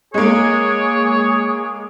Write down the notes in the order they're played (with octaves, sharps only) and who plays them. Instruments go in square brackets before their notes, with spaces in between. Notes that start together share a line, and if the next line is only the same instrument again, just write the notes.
[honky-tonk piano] G#3 A#3 [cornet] G#4 [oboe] C#5